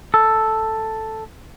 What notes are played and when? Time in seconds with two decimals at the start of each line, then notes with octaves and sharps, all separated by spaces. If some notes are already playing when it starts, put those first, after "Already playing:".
0.14 A4